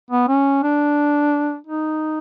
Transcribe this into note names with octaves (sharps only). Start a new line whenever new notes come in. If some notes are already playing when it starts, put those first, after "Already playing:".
B3
C#4
D4
D#4